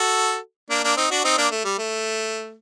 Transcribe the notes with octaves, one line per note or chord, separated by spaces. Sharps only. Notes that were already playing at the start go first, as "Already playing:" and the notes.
Already playing: F#4 A4
A#3 D4
A#3 D4
C4 D#4
D4 F#4
C4 D#4
A#3 D4
A3
G3
A3